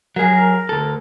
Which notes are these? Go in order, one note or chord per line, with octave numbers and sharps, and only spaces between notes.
F#3 G#4 A#4
D2 A4